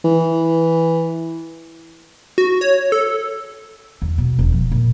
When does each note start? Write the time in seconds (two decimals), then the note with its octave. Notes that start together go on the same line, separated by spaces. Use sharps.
0.05 E3
2.38 F#4
2.61 C#5
2.92 A4
4.02 E2
4.18 B2
4.39 E1
4.52 F3
4.71 A#2